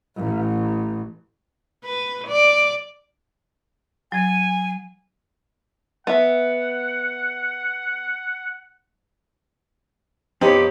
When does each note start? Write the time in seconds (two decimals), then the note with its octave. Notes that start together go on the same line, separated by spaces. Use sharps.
0.17 A1
1.85 B4
2.28 D5
4.12 F#3 G#5 G#6
6.07 B3 E5 F#5
10.41 F2 B3 C4 D#4 E4 G4 C#5